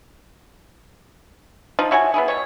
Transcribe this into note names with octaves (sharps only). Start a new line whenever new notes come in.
F3 D#4 F4
E4 F#4 C#5 G#5
B3 E4 G#4
B2 G3 C#5